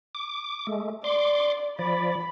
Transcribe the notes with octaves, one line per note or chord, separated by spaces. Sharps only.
D6
G#3 A3
D5 C6 D6
F3 D5 B5